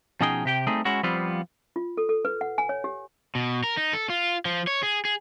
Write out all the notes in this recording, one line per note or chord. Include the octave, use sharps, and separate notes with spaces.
B2 F3 C#4 D#4 G#4 G5
C3 G4 G5
G3 A3 C4 D#4 G#4
G#3 C#4 E4 F#4
F3 G3 B3 C4 F4
F4
A4
A4
B4
F#5
G#5
C#5
G4
B2
A#4
D#4
A4
F4
F3
C#5
G#4
G#4